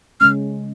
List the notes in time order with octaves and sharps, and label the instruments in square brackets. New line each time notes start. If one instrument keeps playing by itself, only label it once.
[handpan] C#3 G#3 C#4 [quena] F6